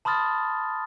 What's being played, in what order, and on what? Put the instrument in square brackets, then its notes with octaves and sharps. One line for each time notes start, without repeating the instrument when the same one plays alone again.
[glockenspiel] A5 B5 C6 D#6 F6 A6